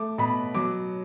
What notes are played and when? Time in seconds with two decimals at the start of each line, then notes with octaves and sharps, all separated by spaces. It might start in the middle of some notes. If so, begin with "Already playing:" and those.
Already playing: A3 D6
0.18 B2 B5
0.54 F#3 D6